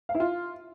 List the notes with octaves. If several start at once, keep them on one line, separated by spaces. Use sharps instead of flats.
F5
E4
F4